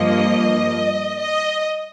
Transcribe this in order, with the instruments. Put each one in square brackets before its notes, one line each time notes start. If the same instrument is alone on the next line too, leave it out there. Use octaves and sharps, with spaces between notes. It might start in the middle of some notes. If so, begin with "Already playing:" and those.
Already playing: [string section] G2 F3 A#3 D#5
D#5